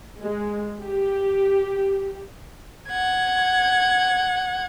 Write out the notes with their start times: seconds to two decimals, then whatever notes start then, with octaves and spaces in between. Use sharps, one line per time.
0.23 G#3
0.80 G4
2.89 F#5 G#6